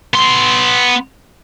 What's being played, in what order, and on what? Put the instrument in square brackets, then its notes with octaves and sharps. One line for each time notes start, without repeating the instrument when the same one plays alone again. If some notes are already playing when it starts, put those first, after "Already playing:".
[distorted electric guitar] B3 C6